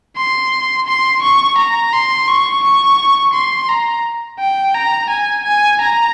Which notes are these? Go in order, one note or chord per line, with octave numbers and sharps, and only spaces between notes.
C6
C6
C#6
A#5
C6
C#6
C#6
C6
A#5
G5
A#5
G#5
G#5
A#5